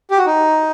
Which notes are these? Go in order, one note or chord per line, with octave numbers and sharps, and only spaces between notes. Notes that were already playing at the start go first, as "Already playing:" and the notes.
G4
F#4
D#4